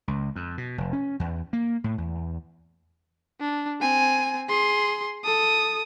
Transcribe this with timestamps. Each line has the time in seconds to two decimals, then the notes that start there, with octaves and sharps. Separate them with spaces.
0.08 C#2
0.36 F2
0.58 B2
0.78 F1
0.93 C#4
1.20 E2
1.53 A#3
1.84 A2
1.98 E2
3.40 D4
3.81 C4 G#5
4.49 G#4 C6
5.24 A4 D#6